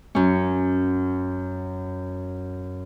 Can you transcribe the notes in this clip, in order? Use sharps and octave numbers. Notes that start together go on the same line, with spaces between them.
F#2 C#4